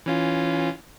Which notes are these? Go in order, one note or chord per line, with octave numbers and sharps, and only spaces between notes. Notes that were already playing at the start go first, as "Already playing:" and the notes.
E3 C#4 F4